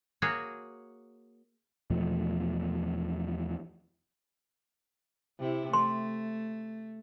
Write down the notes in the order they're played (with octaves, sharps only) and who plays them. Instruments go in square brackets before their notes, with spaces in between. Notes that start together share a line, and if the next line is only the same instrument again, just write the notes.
[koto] A#3 F#4 G#4 C#5
[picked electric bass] E2 B2 F3 A3
[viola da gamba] C3 E4
[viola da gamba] A3 [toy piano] C6